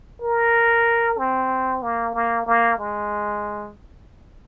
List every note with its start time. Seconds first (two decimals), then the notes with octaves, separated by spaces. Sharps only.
0.22 A#4
1.18 C4
1.83 A#3
2.14 A#3
2.46 A#3
2.79 G#3